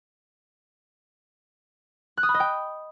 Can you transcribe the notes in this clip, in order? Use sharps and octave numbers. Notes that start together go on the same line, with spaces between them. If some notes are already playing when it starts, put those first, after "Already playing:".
F#6
D#6
B5
D#5
G5